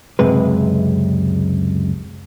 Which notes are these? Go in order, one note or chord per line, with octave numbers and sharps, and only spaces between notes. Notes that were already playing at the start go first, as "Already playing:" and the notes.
C#2 F#2 C3 G#3 B4